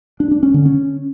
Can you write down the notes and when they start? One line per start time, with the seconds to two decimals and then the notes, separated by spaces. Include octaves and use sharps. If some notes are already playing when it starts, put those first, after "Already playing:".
0.20 D4
0.31 D4
0.43 C#4
0.54 D3
0.65 C#4